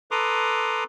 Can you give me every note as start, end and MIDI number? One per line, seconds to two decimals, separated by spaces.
0.11 0.84 69
0.11 0.84 71
0.11 0.84 82
0.11 0.84 84
0.11 0.84 86
0.11 0.84 87